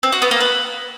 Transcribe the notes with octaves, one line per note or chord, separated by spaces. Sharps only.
C4
F#4
B3
A#3
B4